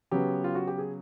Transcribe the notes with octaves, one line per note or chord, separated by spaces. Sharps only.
C#3 F#3 B3 G4
F4
F#4
G4
G#4